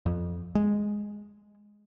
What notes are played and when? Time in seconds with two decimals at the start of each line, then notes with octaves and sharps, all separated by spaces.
0.06 F2
0.55 G#3